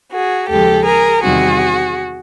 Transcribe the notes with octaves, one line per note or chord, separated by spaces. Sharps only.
F#4 G#4
D#2 C#3 F3 G#3 G4 A4
G#4 A#4
E2 C3 D#3 G3 C4 F#4 G#4